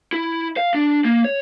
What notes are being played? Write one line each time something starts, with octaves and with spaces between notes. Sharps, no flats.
E4
F5
D4
A#3
C#5